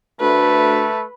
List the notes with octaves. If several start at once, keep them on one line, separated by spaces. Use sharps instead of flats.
D2 A3 B4